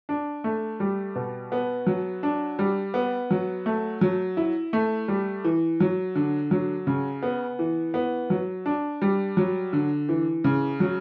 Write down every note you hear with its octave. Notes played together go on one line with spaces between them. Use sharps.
D4
A3
G3
B2
B3
F#3
D4
G3
B3
F#3
A3
F#3
E4
A3
G3
E3
F#3
D3
F#3
C#3
B3
E3
B3
F#3
D4
G3
F#3
D3
E3
C#3
F#3